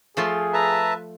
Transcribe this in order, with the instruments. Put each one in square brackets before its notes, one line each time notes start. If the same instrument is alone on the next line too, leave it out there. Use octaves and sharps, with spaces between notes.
[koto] F3 A3 F4 [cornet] G#4
[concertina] B4 E5 A5 [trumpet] A#5